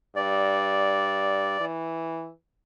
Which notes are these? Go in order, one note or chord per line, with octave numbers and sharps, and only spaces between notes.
G2 D5
E3